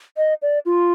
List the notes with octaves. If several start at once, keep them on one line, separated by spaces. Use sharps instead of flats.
D#5
D5
F4